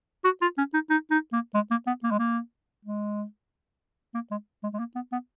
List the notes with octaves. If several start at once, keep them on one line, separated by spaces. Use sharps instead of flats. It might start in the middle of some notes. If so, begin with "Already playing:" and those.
F#4
F4
C#4
D#4
D#4
D#4
A#3
G#3
A#3
B3
A#3
G#3
A#3
G#3
A#3
G#3
G#3
G#3
A#3
B3
B3